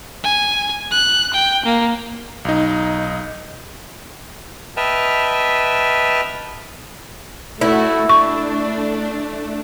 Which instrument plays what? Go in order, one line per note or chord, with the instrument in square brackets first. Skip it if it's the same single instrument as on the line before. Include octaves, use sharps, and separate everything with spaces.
[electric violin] G#5
F#6
G5
A#3
[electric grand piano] B1 D#4
[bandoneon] B4 D#5 E5 G5 A5 F6
[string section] A3 F#4 [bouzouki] E4
[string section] A3 D4 [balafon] C#6